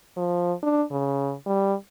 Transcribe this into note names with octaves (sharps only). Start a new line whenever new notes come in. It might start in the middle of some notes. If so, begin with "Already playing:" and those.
F3
D4
C#3
G3